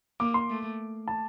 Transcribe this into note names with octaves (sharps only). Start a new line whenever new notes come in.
A#3 D6
C6
A3
A5